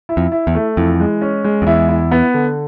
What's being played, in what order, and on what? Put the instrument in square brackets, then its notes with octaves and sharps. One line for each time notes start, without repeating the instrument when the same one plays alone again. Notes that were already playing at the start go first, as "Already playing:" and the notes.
[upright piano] E4
[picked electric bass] F2
[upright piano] E4
[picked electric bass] E2
[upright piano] A3
[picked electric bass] F2 [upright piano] E3
[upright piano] G#3
C#4
G#3
[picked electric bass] F2
[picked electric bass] E2 [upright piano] E4
[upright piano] E4
B3
D3